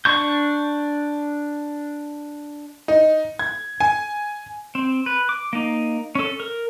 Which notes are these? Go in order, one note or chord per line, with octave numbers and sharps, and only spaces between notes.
D4 C#6 G6
D#4
G#6
G#5
C4
B4
D6
A#3 D#4
C#4 A4
A#4